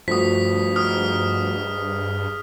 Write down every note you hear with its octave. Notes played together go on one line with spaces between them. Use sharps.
G2 F3 A3 F#4 D#6 B6
G#2 D#6 F6